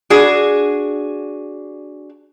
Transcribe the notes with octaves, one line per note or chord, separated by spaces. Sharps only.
D4 F#4 G#4